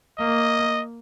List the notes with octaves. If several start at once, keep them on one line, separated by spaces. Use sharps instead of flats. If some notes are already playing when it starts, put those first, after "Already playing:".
A#3 D#5